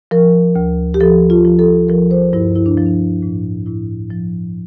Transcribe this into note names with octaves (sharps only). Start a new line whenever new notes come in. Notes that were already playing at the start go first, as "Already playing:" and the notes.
F3 A#4
D2
G4
F3 A4
F4
F3
A4
F3 A#4
C5
G2 E4
E4
D4
F3
D4
A2
A2 E4
F3